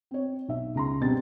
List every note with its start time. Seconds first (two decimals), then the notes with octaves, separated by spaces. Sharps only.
0.11 C4 C#5
0.48 B1 E5
0.75 C#2 A#5 C6
1.01 G2 B2 G3 C4 D4 A6